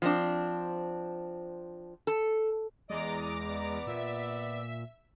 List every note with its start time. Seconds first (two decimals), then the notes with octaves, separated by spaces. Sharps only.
0.02 F3 C4 D4
2.07 A4
2.90 E2 G#3 D5 D#5 A#5 D6
3.49 B3 D5
3.87 A#2 E5